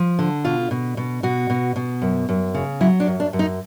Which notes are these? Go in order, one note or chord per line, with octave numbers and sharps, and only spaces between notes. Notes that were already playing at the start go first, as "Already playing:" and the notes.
Already playing: F3
D3
B2 F4
B2
B2
B2 F#4
B2
B2
F#2
F#2
C#3
F#3 E4
D4
F#2
D4
F#2
D#4